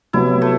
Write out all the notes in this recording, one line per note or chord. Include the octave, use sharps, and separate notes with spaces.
C3 F#3 B3 E4 F#4
A3